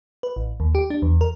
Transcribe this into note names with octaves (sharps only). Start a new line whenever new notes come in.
B4
A1
D#2
G4
D4
E2
A#4